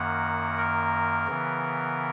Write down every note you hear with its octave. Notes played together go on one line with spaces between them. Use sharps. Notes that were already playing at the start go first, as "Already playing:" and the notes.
Already playing: F#2 D#3 A#3 F#5
A#4
C#3 E3 B3